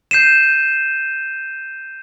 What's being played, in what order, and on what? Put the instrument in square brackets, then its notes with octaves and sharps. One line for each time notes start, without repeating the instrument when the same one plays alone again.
[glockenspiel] G6 C7 D#7 E7